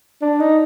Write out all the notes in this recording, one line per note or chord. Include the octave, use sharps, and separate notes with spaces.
D4
D#4